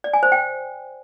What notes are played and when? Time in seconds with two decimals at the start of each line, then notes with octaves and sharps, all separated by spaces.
0.04 D5
0.13 G#5
0.23 C5
0.32 G5